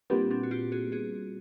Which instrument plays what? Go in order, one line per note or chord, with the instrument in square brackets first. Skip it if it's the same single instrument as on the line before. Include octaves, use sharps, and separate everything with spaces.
[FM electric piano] A#2 G3 B3 [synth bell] C4 D4
[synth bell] C4 D4
F#4
F4 G4
F#4 G#4
F#4 G#4